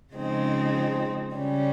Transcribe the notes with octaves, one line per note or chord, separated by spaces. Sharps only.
C#3 F3 G#3 C4 D#4
C#3 G3 C#4